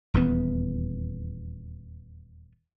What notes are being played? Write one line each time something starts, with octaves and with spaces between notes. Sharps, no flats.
D#1 E2 E3 B3